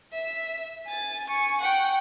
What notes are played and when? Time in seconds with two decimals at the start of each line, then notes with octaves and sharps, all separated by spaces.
0.13 E5
0.87 G#5 A6
1.28 G#5 C#6
1.61 F#5 G5